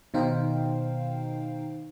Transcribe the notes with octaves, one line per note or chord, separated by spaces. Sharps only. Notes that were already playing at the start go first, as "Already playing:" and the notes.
B2 D#3 D#4 C5 F5 G5